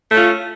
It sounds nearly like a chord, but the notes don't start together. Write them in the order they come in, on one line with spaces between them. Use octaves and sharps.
A3 C#4 F4